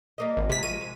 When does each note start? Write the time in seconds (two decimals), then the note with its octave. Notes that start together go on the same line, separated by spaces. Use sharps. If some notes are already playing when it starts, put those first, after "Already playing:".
0.18 G3 A#3 D#5
0.37 G#1
0.50 C3 G#3 F4 B6
0.63 F3 F#3 G#3 D#7
0.81 G#3